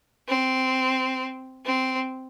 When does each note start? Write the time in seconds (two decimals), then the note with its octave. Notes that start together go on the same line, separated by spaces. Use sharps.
0.28 C4
1.65 C4